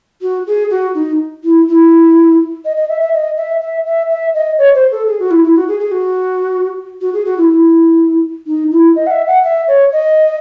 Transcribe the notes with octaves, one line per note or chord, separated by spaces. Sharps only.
F#4
G#4
F#4
D#4
E4
E4
D#5
D#5
E5
E5
D#5
E5
E5
E5
E5
D#5
C#5
C5
A4
G#4
F#4
E4
E4
F#4
G#4
G#4
F#4
F#4
G#4
F#4
E4
E4
D#4
E4
D#5
F#5
E5
F#5
E5
C#5
D#5